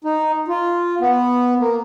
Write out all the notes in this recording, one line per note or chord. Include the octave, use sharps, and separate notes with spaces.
D#4
F4
B3
A#3